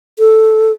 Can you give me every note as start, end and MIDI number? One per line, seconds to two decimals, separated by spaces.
0.19 0.72 69